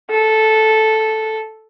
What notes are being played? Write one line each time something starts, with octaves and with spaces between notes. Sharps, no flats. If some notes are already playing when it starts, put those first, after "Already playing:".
A4